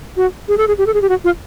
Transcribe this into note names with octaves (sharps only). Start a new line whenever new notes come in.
F#4
G#4
A4
G#4
G4
A4
G#4
G4
F#4
F4